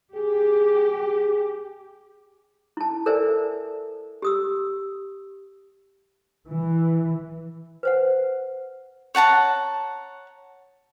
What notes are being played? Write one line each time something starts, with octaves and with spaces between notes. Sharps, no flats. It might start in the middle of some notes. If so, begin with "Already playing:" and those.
G4 G#4
G#4
E4 A5
A4 A#4 C5 D5 E5 G#5
G4 D#6 E6
E3
B4 C5 F#5
C#5 F#5 A5 A#5